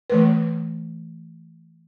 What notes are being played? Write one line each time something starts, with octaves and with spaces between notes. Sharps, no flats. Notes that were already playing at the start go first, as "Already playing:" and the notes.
E3 A3 B4